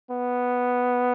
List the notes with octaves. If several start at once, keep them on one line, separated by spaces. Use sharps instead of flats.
B3